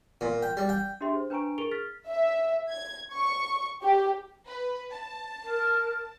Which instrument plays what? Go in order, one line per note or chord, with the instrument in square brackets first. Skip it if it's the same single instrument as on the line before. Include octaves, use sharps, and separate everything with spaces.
[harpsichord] A#2
G5
G3
G5
[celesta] D4 G4 G#4 E5 C6
C5
D4 B4 G#5 A#5 C#6 D7
G#4 A#4 C#6 D7 F7 G7
F6 A6 B6
[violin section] E5
G#6
C#6
G4
B4
A5
[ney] A#4